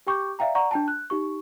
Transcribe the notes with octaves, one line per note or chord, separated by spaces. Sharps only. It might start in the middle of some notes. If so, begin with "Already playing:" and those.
G4 G5 C#6 D6 G6
D5 E5 F5 G5 A#5
D5 F#5 A#5 C#6
D4 G5 A5
F#6
D#4 G4 C#6